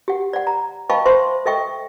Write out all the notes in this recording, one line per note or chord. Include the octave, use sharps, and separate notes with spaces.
G4 F#5
D5 F#5
A#5
D#5 F5 G5 A5 B5 C#6
C5 E5 C6 C#6
A4 D#5 E5 G5 C#6